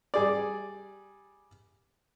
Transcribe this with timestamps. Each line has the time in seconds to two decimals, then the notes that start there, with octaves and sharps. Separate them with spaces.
0.14 G3 G#4 D5